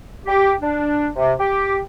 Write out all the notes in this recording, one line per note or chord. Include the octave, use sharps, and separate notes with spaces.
G4
D4
C3
G4